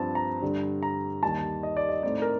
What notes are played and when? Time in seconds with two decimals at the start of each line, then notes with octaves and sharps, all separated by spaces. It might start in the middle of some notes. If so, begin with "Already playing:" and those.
Already playing: G2 F3 C4 A5
0.15 A#5
0.42 G2 D3 G3
0.83 A#5
1.22 D#2 D#3 G3 A5
1.63 D#5
1.77 D5
1.89 D#5
2.03 A2 A3 C4 D#4 D5
2.22 A#4